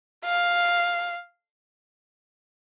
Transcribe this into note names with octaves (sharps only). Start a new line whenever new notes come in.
F5